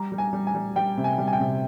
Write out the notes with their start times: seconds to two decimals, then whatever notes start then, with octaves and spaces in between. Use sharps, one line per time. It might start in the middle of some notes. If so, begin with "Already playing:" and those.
Already playing: G3 A#5
0.12 G3
0.18 G#5
0.33 G3
0.47 G#5
0.55 G3
0.76 G3 G5
0.97 C3
1.04 G#5
1.18 G3
1.27 G#5
1.33 G5
1.40 C3